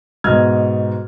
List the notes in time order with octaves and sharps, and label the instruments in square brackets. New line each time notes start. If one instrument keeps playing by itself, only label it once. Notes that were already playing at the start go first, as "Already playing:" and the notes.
[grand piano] G#2 B2 D#5 F6 G#6